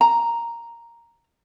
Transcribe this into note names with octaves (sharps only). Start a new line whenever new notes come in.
A#5